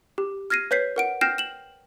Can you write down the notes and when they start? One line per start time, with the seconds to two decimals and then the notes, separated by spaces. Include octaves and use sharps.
0.18 G4
0.50 F6 G#6 A#6 C7 D#7
0.71 B4 C#5 G6 B6 C7
0.96 A#4 F#5 D7
1.21 G5 F6 G6 A#6 C7 E7
1.38 E7 F#7